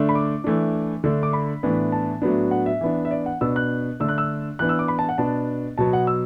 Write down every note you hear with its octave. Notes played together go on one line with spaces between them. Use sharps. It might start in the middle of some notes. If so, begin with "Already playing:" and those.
Already playing: D3 A3 D4
B5
D6
E3 A3 D4
D3 A3 D4
D6
B5
A2 E3 B3 D4
A5
A2 F#3 B3 D4
F#5
E5
E3 B3 D4
E5
D5
F#5
B2 B3 D4 E6
F#6
D3 A3 D4 E6
F#6
E6
E3 B3 D4 F#6
E6
D6
B5
A5
F#5
B2 B3 D4 A5
B2 F#3 B3 A5
F#5
E6